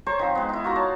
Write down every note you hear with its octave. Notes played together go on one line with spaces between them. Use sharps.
C5 C#5 A#5 C#6
D#3 F3 C4
G#3 B3
D#4 E4
F4 F#4 A#4 A#5
C#5 A5